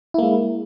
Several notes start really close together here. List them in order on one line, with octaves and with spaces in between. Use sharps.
E4 A#3 G#3